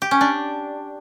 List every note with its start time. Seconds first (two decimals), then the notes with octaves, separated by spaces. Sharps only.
0.02 G4
0.11 C#4
0.21 D4